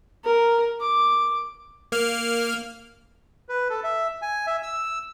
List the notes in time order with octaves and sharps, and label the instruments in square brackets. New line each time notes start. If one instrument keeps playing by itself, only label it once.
[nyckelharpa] A#4
D6
[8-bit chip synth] A#3 F6
[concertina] B4
A4
E5
G#5
E5
E6